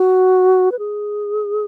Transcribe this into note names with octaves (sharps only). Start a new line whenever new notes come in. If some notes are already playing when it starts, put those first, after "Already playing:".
Already playing: F#4
B4
G#4